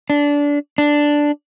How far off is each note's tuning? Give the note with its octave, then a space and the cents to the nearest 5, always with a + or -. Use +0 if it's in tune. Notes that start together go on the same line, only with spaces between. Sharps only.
D4 -20
D4 +0